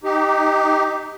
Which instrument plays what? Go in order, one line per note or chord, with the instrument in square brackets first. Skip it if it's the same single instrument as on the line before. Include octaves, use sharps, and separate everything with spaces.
[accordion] D#4 G4